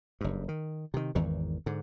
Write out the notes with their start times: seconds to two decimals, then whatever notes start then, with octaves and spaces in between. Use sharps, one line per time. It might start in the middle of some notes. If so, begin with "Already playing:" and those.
0.21 F#1 G2
0.48 D#3
0.94 C3 D#3
1.15 G#1 E2 D#3 E3
1.66 G#2 D3